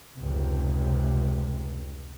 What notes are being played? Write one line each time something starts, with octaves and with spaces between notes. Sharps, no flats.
F1 C#2 C3